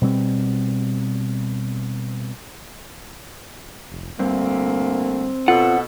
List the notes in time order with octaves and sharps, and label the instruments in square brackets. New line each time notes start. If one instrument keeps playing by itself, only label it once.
[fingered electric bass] B2 G3 C4
[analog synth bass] F1
[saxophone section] D2 A3 A#3 [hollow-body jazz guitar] G2 [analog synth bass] C4
[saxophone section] B2 A4 [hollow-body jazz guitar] F4 [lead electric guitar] F#5